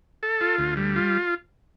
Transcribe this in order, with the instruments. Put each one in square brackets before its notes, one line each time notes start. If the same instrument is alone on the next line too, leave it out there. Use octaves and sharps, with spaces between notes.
[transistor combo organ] A4
F4
D2
G3
F4